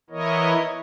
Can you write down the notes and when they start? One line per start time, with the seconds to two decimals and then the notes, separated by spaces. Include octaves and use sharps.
0.10 E3 B3 E4 A#4 C#5 D#5